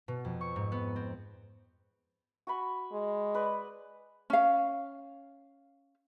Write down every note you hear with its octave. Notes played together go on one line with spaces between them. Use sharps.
B2
F2
C#6
G#2
B3
C4
F#4 G#5 B5
G#3
B4 D5 D#5
C#4 F5